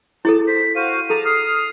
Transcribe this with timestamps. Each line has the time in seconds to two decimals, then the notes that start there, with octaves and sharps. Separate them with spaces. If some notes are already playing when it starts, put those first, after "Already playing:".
0.25 E4 G#4 A4 A5
0.47 C5 B6
0.76 F#4 C5 F5 D#7
1.10 G#4 A4 A5 A#5
1.25 D#6 F6 C7